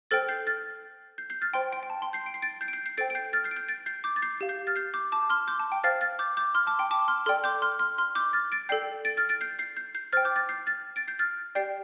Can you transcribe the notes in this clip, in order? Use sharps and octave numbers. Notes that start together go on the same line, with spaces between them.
A4 C5 G5 F6 A6
G6 C7
F6 A6
G6 C7
G6 C7
F6 A6
C5 G5 C6
G5
G5
A5
G5 C6
G6 C7
D7
C7
A6 D7
G6 C7
D7
G6 C7
G6 C7
A4 C5 G5 A6 D7
D7
G6 C7
F6 A6
G6 C7
D7
G6 C7
A6 D7
G6 C7
D6 G6
A6
G6 C7
G4 F5
G6 C7
F6 A6
G6 C7
D6 G6
A5 D6
C6 F6
D6 G6
A5
G5
C5 F5 F6 A6
F6 A6
D6 G6
D6 G6
C6 F6
A5 D6
G5 C6
A5 D6
C6 F6
A4 D5 G5 C6 F6
D6 G6
C6 F6
C6 F6
C6 F6
D6 G6
F6 A6
A6 D7
A4 D5 G5 G6 C7
A6 D7
F6 A6
A6 D7
G6 C7
G6 C7
G6 C7
G6 C7
C5 G5 F6 A6
D6 G6
F6 A6
G6 C7
F6 A6
A6 D7
G6 C7
F6 A6
G4 D5 G5 G6 C7